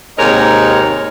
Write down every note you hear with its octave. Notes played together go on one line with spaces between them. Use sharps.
D#2 G#2 C3 A#4 C#5 D#5